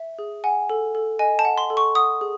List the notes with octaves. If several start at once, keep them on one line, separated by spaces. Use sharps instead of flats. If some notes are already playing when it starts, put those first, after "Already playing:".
Already playing: E5
G#4
F#5 G#5
A4
A4
D#5 G#5
A5
F#5
C6
A4
C#6
F#5 D#6
G#4